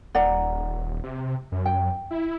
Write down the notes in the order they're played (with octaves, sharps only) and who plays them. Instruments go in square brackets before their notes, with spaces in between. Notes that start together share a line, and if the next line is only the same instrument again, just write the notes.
[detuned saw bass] D#1 [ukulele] D5 F#5 A#5
[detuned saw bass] C3
F#2
[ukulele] G5
[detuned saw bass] E4